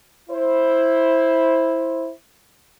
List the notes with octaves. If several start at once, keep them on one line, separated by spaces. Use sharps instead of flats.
E4 C5